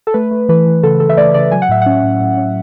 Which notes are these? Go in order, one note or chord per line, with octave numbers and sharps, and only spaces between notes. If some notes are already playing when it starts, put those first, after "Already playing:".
A4
A3 B4
A3
E3 B4
E3
C#3 A4
C#3 A4
E5
A3 D5
C#3 D5
F#3 G#5
F#5
A2 E5
C#4 F#5
A2
A2
C#4